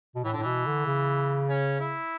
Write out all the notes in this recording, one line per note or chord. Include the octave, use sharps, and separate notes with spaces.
B2
A2 E3
D3
A2
B2 E3
D3
C#3
C#4
E4